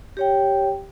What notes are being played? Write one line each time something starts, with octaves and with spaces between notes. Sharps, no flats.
G4 C#5 G5